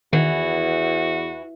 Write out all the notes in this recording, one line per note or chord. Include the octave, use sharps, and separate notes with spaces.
E2 D#3 E3 F#4